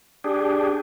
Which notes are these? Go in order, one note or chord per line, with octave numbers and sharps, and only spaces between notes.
D4 G4 G#4